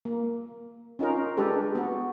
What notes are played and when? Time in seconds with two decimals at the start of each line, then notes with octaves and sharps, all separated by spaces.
0.05 A#3
0.99 C#4 D#4 F4 A#4
1.37 G#3 D4 G4 A4 B4
1.75 B3 F#4